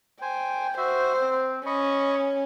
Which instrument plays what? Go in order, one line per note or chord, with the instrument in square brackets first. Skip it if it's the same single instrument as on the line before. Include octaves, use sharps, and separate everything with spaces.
[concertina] C5 G#5 [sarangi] G5
[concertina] F#4 E5 [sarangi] C5
[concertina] C4
[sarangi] C#4 [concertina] D#5 B5 C#6